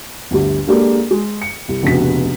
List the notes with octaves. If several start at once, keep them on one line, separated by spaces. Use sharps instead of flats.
G1 D2 G4
G#3 A#3 D4 G4 A4
G#3 G#4
C#7
C2
F1 A#1 C#3 B3 F#4 B6